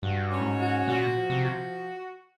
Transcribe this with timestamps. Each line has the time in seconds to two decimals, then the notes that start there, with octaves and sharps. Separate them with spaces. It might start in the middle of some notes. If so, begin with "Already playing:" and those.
0.03 G2 F#4
0.31 C#4
0.40 A2
0.45 G#2
0.60 F#4
0.88 A#2 F#4
1.16 F3
1.30 C3
1.44 F#4